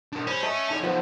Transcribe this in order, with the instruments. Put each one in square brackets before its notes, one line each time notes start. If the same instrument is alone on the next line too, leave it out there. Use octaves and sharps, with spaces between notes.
[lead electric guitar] D4 A#4
[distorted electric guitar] C#4 [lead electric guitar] C5 B5
[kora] D#5 [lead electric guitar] E5 A5
[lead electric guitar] D#4 A4
[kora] F3 B3